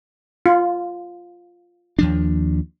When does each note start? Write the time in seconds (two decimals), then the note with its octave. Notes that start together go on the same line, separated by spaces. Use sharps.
0.46 F4
1.99 D#2 F3 D4